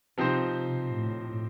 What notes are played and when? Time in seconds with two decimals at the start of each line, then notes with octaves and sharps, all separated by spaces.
0.18 C3 F3 C4 D#4 G4 C5
0.94 A2